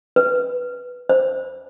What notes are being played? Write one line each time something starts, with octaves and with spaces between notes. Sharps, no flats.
B4
C5